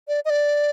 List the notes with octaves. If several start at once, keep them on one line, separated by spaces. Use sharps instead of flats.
D5
D#5
D5